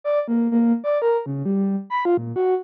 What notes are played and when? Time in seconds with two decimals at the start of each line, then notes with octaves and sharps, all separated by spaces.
0.04 D5
0.28 A#3
0.51 A#3
0.84 D5
1.02 A#4
1.26 C#3
1.45 G3
1.90 B5
2.05 F4
2.17 A#2
2.36 F#4